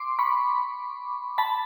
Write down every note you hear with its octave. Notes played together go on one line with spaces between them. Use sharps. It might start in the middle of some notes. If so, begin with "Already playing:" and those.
Already playing: C6 D6
B5 C#6
A5 B5